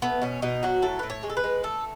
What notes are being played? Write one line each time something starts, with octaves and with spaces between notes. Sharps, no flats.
A3 B3
B2 C#4
B2 D#4
F#3 F#4
A2 A4
A2 B4
C#5
G#3
A4
B4
G#3
A3 A4